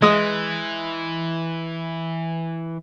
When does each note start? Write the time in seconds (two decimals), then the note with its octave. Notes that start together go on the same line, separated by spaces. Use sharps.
0.02 E3 G#3 D#6